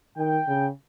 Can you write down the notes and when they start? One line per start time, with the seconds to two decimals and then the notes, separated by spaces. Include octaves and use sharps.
0.17 D#3 G5
0.48 C#3